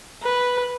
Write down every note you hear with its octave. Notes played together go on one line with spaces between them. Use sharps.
B4